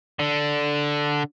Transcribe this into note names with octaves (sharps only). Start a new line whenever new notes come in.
D3